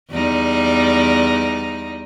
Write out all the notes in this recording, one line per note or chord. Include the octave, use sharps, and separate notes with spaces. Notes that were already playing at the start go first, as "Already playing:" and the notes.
E2 G3 D#4